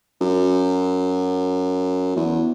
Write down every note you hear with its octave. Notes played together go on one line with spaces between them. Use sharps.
F#2
E2